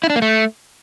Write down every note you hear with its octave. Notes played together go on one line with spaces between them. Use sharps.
E4
D4
A#3
A3